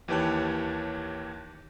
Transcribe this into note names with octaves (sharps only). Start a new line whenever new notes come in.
D#2 E3 G4 C#5 A5 F#6